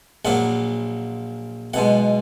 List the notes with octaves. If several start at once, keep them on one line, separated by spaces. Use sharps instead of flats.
A#1 A#2 F#3 A#3 F#5
B1 B2 G#3 F#5